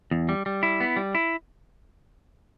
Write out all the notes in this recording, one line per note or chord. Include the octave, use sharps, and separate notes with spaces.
E2
G3
G3
E4
B3
G3
E4